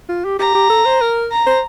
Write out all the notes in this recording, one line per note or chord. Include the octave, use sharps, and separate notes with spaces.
F4
G4
G4 A#5
G4
A4
C5
A#4
A#5
C5